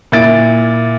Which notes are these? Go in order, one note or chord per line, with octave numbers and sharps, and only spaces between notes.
A#2 E4 A6 D7